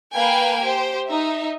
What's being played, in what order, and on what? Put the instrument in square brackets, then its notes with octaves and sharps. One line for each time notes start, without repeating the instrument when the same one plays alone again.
[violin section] A#3 B4 F5 G5 G#5
G4 C5
D#4 E5